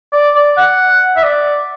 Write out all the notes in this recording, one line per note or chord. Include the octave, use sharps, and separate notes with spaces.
D5
D5
F#5
E5
D5